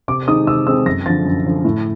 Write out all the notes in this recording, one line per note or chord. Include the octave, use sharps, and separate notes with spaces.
C3 D6
D#3 G#3 C4 D#4 D#6
C3 E6
D#3 G#3 C4 D#4 E6
F#2 A#6
D3 F3 A6
F#2
D3 F3
A2